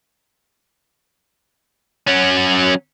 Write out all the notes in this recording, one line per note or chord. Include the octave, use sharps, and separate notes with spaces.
F#3 C#4